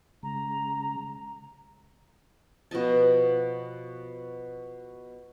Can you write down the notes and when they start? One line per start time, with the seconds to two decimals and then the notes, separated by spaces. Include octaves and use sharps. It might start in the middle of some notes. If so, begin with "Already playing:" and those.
0.23 C#3 G#3 A#5
2.71 B2 F3 D#5 A5